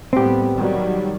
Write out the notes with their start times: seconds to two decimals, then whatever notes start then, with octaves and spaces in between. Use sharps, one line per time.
0.13 A2 G3 B3 C4 G4
0.55 D#3 F#3 G3